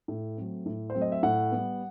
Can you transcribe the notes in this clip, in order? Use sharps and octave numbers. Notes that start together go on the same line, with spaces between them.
A2
F#3 A3 C4
A2
C5
F#3 A3 C4
D#5
E5
A2 F#5
G3 B3